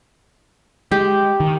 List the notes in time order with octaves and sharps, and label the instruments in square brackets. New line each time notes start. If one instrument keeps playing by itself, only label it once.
[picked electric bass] G#3 [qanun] G4
[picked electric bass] D#3